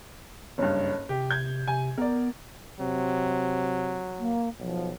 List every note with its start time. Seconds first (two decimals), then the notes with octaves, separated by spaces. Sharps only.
0.58 F#1 G2 C#5
1.09 C3 G4
1.31 G6 G#6
1.68 C3 G#5
1.98 B3 A#4 D5
2.80 C3 F#3
4.19 A#3
4.59 B1 F3